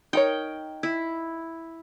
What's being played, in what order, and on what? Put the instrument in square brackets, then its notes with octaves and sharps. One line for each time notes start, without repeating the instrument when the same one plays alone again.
[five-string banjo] D#4 A#4 C#5 [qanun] G5
[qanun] E4